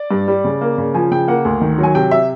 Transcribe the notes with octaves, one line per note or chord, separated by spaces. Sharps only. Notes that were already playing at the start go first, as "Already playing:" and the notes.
Already playing: D5
G2
G3
C#3
A#3
C#3
F3 G#5
C#3 G5
A#3 F#5
D2
D#3
F#3 G#5
C3 G5
E5